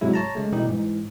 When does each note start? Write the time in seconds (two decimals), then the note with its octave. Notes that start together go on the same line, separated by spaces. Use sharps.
0.01 G#2 C3 F#3 G#3 E4
0.13 C#5 A5 A#5
0.35 C#3 G#3 A3
0.52 B2 E3 G3 D#4 G4
0.68 G#2 E3